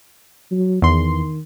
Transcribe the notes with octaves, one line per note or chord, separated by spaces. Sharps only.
F#3
E2 D#3 C6